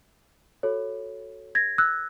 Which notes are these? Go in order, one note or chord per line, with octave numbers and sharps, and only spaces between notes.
F#4 A4 C#5
G#6 A#6
E6 F#6